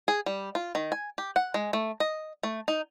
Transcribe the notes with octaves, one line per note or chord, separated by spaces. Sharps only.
G#4
G3
F4
D#3
G#5
G4
F#5
G#3
A3
D#5
A3
D#4